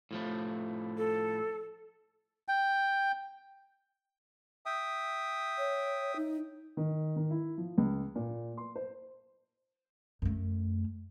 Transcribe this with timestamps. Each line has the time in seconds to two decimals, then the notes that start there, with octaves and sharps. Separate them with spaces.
0.11 A2 F3 A3
0.98 A4
2.48 G5
4.66 E5 G5 D#6
5.58 C#5
6.16 D#4
6.77 D#3
7.16 D#3
7.30 E4
7.58 F3
7.78 C#2
8.15 A#2
8.57 C6
8.76 C5
10.22 F#2 A3